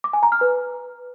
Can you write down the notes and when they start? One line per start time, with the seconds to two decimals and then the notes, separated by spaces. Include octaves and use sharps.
0.04 D6
0.13 G#5
0.23 A#5
0.32 F6
0.41 B4